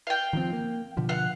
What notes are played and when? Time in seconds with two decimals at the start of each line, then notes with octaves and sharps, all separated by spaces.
0.07 F5 G5
0.33 D#3 F3 C4
0.53 A#3
0.97 B2 D3 F3
1.09 F5 F#5